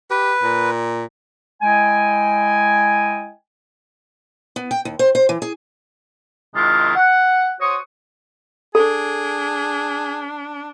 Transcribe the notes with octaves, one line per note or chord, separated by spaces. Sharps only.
G4 B4
A#2
G#3 E4 D#5 G5 G#5
B3
G5
D#2
C5
C5
E3
G#4
C3 D#3 G#3 D4 E4 F4
F#5
F#4 C5 C#5 C#6 D#6
D4 G#4 A4